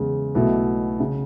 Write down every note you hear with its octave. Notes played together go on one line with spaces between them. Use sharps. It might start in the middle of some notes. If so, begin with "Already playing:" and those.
Already playing: E2 C#3 G#3
B1 B2 A3 E4 A4
C#3